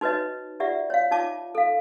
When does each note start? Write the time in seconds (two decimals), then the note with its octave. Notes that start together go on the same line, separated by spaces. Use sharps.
0.01 D#4 F#4 B4 C#5 D#5
0.60 F4 G4 D5 E5 F#5
0.90 C#5 F5
1.11 D#4 F4 C#5 A5 D6
1.55 A4 F5